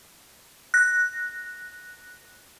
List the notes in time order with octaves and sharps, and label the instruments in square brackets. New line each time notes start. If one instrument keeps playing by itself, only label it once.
[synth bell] F#6 A#6